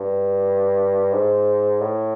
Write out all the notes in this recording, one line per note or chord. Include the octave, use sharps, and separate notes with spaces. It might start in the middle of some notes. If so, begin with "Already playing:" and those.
Already playing: G2
G#2
A2